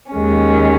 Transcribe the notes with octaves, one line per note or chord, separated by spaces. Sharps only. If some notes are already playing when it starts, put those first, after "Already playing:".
D#2 D#3 G#3 C#4